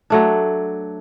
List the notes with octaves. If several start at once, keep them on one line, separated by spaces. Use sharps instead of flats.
F#3 A3 D4